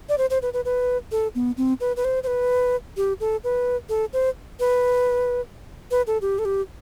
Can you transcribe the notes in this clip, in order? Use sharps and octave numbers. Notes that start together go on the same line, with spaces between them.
D5
C5
C5
B4
B4
B4
A4
B3
C4
B4
B4
C5
C5
B4
G4
A4
B4
A4
C5
B4
B4
A4
G4
A4
G4